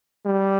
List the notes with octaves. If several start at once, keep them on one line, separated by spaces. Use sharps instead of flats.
G3